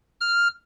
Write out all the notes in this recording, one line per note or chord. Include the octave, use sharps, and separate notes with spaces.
F6